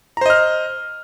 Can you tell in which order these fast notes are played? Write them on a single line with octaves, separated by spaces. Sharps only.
A#5 C5 D#5 F6